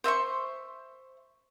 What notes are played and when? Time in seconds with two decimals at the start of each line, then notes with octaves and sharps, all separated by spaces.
0.04 C5 E5 C6 C#6